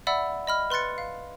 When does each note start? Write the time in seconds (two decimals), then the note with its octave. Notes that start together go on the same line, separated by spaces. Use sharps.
0.07 D5 E5 F#5 B5 E6
0.47 D#5 B5 F6
0.70 B4 C6 F#6 A6 C#7
0.98 F5